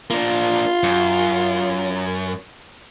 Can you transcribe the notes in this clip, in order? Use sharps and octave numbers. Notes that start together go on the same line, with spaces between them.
A#3 D4 F4
F#2